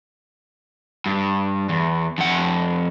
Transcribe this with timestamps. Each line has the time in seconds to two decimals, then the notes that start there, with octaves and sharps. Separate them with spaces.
1.06 G2
1.69 E2
2.18 F2 F#5